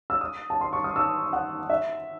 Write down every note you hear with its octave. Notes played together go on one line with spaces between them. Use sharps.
E6
D#6
A5
C6
C#6
D#6
E6
F#5
E5